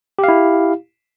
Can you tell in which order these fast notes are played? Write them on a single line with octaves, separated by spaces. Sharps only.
G4 F5 E4